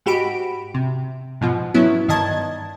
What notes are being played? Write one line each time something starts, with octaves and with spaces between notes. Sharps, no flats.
G#2 F#4 G4 B5 D7
C3
G#2 B2 F3
F#3 B3 C#4 E4
G2 D#3 D#5 A5 G#6